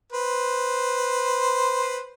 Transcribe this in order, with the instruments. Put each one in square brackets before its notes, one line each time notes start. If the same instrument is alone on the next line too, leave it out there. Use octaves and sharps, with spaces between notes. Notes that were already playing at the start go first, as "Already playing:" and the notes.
[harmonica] B4 C5